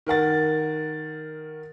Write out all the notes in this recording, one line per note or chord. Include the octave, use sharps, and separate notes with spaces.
D#3 A#4 F#5 A6